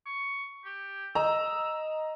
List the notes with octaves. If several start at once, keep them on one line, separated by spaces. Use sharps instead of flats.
C#6
G4
D#5 A#5 E6